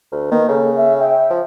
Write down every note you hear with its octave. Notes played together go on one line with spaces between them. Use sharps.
D2
D#3 A#3 B4
C#3 A4
E5
E5 G5
F3